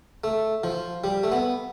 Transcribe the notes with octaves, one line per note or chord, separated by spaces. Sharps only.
A3
F3
G3
A3
B3